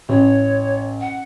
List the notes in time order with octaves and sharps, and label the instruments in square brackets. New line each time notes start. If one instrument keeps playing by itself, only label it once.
[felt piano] A1 [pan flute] C#5
[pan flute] F#5